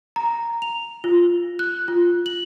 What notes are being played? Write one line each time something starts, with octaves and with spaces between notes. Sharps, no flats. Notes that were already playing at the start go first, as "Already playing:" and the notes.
A#5
F7
F4
F#6
F4
F#7